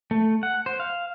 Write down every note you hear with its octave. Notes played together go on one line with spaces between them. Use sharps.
A3
F#5
C5
F5